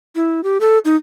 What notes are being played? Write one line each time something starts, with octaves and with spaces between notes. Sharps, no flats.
E4
G4
A4
D#4